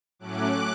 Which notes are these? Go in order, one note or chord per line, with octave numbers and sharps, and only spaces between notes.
A2 F#3 A3 C#4 D6 F#6